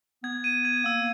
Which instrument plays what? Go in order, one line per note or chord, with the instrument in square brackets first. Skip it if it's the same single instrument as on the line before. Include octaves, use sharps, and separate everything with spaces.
[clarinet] B3 [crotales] G#6
[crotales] D#7
G#6
[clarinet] A#3 [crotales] E6